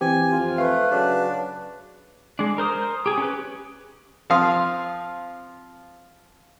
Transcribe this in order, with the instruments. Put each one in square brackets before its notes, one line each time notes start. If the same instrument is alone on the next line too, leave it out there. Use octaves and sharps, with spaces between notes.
[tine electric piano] E3 C4 G4 [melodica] G#5
[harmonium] F2 F4
[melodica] A3 [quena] B4 [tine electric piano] F5
[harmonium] C#3 F#3 [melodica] D4
[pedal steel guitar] G#3 D4
A#4 C5 D#6
G4 G#4
C#4 G4 B4
[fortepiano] F3 C4 F5 D#6